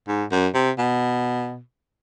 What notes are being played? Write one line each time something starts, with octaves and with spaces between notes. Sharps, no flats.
G#2
F#2
C3
B2